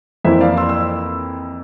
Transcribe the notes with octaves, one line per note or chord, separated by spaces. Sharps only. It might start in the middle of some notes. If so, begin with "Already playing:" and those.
F2 E3 A#3 E4 C5 E5
D5 F5
C6 E6
E6